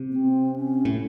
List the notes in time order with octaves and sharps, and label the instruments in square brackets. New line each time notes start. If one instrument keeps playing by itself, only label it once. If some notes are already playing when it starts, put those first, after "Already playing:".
Already playing: [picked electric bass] C3
[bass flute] B3
C4
C#4
[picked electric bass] A2